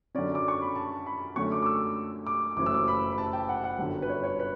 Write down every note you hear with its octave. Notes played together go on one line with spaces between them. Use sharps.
F#2 D3 F#3 C#4 D5
D6
C#6
B5
A5
B5
F#2 D3 A3 C#4 C#6
D6
D6
E6
D6
F#1 F#2 E3 A3 C#4 D6
E6
D6
B5
B5
A5
G5
F#5
F#5
G1 F#2 D3
B4
C#5
C#5
B4